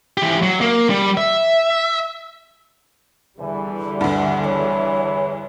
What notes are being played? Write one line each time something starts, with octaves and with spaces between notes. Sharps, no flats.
E3 G4
F#3
A#3
G3
E5
E2 D3 E3 G3
D2 G2 F#5
C#5